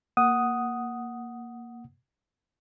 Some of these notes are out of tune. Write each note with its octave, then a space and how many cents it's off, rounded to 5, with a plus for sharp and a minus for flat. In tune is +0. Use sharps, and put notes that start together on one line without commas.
A#3 +0 F#5 +0 D#6 +5